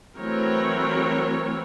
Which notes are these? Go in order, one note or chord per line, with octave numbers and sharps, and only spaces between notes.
E3 F#3 A3 C4 A#4 C#5